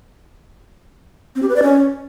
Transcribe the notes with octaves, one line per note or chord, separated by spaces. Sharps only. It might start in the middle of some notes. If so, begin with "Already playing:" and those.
C4
G4
B4
D5
C#4